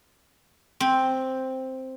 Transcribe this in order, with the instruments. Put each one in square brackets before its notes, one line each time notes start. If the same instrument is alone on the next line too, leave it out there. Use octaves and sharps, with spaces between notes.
[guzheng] C4